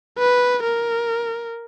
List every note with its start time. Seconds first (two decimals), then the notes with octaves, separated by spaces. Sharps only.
0.18 B4
0.63 A#4